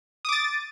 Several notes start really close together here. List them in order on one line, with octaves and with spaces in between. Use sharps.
D#6 D6 A6